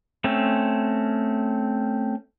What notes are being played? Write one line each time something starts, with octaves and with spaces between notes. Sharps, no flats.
A3 C4 C#4